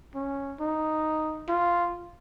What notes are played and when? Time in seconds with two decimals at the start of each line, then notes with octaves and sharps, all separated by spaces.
0.15 C#4
0.60 D#4
1.48 F4